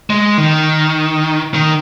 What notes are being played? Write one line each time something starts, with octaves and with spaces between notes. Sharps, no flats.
G#3
D#3
D#3